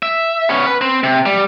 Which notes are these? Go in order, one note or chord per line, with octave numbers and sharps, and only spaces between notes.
E5
B3 C#4
B4
C4
C3
G3